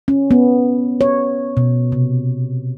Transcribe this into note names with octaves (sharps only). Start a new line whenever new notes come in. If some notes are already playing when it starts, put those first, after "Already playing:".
C#4
B3
C#5
B2
C3